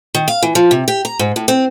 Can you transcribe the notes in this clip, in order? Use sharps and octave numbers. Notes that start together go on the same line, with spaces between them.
D#3
F5
E3
F3
C3
G4
A#5
G#2
A2
C4